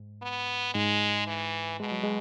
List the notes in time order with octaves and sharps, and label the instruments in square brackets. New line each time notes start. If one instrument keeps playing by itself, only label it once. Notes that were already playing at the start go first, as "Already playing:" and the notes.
Already playing: [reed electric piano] G#2
[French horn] B3
[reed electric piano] G#2 [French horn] G#3
[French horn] E3
[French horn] B2 [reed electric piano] G#3
[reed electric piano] F#3
G#3